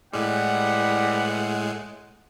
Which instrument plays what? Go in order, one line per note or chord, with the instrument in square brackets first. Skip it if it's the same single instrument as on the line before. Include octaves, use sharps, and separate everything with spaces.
[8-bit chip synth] A2 G#3 [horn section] E3 G3 [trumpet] F#5